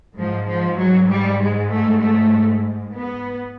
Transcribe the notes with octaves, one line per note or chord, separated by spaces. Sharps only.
G#2 F3
F3
F#3
G3
G#3
A3
A3
B3